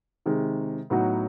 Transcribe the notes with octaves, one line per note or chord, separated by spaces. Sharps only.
C3 D#3 G#3
A2 F#3 B3 D#4 F#4